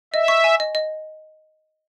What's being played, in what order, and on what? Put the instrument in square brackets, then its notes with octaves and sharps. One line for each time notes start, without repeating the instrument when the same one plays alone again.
[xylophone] D#5 [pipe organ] E5
[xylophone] C#6
G#5
D#5
D#5